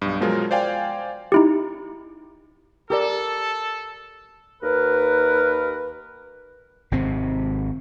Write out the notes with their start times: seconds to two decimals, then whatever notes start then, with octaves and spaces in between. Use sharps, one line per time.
0.02 B1 G2
0.20 B2 F3 F#3 G#3 F4 A#4
0.51 C5 D5 F5 G5 G#5
1.32 D#4 E4 G4
2.90 G4 A4 A#4 D5
4.62 D#2 A#4 B4
6.91 G#1 C3 C4